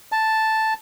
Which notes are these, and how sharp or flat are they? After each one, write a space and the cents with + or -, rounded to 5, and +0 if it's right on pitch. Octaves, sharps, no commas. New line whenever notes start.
A5 +0